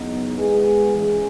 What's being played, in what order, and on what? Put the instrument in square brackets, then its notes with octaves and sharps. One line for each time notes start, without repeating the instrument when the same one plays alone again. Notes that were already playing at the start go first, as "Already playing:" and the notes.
Already playing: [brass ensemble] F#2 C#3 E3 B3 D#4
G#3 B3 E4 G#4
E3 G#3 C#4 G#4